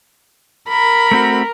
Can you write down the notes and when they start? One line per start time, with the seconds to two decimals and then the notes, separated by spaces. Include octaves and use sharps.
0.69 A#4 B5
1.11 A3 C4 F#4